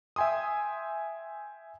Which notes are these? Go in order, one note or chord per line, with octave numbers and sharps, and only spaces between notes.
E5 G5 G#5 C6 D#6